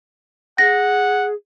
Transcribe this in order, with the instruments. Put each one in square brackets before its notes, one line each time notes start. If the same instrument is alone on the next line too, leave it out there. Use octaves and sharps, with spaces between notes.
[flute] G#4 [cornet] F#5 [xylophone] A#6